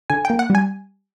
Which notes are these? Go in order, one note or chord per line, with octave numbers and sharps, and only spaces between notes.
D3 G#5
A#3 G5
F#5
G3 G#5